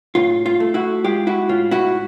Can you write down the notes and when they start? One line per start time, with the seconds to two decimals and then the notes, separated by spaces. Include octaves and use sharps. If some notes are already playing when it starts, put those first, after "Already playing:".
0.15 A2 F4
0.46 F4
0.60 A3
0.74 E4 F#4
1.04 G#3 F4 G4
1.27 E4 F#4
1.49 A2 F4
1.71 E4 F#4